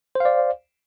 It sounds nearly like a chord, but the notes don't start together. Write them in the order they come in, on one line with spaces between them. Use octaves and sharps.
C5 F5 D5